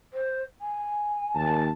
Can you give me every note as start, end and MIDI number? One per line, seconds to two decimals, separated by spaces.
0.13 0.42 72
0.61 1.64 80
1.35 1.69 39
1.35 1.69 81